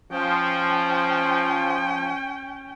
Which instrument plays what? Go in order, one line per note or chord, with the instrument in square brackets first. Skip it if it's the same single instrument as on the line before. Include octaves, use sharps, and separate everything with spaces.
[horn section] F3 [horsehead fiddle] C#4 G5